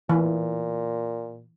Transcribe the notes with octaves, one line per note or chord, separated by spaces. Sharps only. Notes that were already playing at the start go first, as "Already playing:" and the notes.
A#2 E3